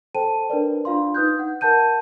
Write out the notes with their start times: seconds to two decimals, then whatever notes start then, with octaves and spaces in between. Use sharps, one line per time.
0.15 A4 C5 G5 A5 D#7
0.50 D4 A#4 B4 D5
0.85 D4 F4 F5 C6
1.14 D#4 B4 D#6 F#6 G6
1.39 F#5
1.61 A#4 F#5 A5 G6 D#7